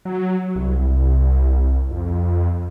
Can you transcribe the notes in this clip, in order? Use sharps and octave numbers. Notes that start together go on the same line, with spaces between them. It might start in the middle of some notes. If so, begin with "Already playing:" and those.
F#3
C2
F2